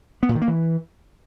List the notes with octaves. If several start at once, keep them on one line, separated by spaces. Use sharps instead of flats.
B3
A#2
D#3
A#3
E3